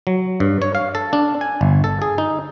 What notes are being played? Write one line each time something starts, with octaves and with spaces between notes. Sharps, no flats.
F#3
G2
C#5
F5
A4
D4
G#5
G1
A4
G#4
D#4